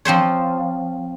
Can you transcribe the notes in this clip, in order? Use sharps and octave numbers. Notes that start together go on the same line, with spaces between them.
F3 C4 C5 C#5